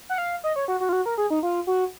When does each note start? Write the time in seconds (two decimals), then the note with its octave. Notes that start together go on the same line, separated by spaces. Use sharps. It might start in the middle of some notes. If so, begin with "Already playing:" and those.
0.09 F#5
0.18 F5
0.44 D#5
0.56 C#5
0.68 F#4
0.80 F#4
0.89 F4
0.93 F#4
1.06 A#4
1.18 G#4
1.30 D#4
1.43 F4
1.67 F#4